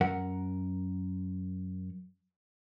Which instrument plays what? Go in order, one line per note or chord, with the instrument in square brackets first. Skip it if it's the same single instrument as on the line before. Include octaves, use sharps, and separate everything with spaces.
[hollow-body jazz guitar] F#2 A#4 F#5